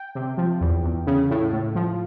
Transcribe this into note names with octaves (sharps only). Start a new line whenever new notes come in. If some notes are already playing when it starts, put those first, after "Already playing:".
Already playing: G5
C3
F3
E2
E2
C#3
A2
A2
F3